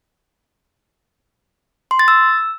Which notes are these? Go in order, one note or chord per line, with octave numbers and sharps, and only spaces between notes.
C6
A6
E6